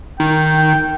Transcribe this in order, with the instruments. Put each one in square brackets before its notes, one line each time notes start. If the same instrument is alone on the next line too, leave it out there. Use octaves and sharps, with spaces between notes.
[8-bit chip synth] D#3 [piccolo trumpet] G5